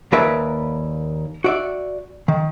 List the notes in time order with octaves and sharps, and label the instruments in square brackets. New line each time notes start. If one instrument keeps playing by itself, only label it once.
[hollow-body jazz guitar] D#2 A#3 A#4 B4 D5 E5
F#4 D5 E5
D#3